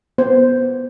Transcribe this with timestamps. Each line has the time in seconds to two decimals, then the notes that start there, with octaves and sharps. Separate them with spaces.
0.18 B3 C5